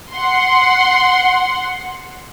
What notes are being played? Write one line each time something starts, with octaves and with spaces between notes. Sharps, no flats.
F#5 C6